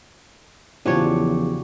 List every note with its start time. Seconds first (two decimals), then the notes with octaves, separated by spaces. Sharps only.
0.86 E2 C#3 F3 F#3 D4 E4 G4 C#5